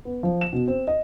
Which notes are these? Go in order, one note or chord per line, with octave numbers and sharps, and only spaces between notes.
B3
F3
E7
B2
C4
D#5